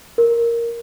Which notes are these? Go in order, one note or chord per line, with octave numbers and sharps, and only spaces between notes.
A#4